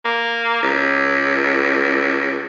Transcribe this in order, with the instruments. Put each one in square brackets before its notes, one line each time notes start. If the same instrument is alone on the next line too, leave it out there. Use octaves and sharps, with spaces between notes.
[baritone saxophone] A#3
C#2